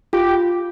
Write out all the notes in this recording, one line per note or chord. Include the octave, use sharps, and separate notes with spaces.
F4 G4